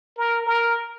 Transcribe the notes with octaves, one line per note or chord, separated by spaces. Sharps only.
A#4
A#4